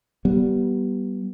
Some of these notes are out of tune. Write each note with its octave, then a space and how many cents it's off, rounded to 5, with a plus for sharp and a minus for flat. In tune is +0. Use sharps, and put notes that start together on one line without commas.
G3 -20 B3 -20